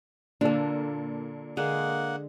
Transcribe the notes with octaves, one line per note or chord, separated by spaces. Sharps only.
A#2 D3 A#3 D4 A4
D3 G#3 A#3 G#4 F#5